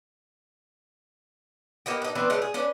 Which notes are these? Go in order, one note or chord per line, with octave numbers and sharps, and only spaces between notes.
A#3 B3 D#4 G4
D4 D#4
E3 B3 C4 D4
C#3 G#3 A3 B4
G#4
C#4 D4 B4